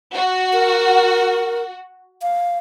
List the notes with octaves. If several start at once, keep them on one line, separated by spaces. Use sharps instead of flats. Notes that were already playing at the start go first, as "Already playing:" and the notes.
F#4
A#4
F5